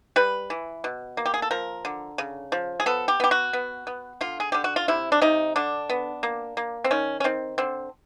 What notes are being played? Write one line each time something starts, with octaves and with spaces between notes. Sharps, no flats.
G3 B4
E3
B2
A#3
G4
G#4
A4
F3 A#4
D3
C#3
F3
G#4
B3 A4
G4
B3 G4
F#4
B3
B3
D3 F4
G#4
D3 G4
F#4
F4
C3 E4
D4
C3 D#4
D3 D4
B3
A#3
A#3
C4
D#3 C#4
C#4
D#3 C4
D3 C4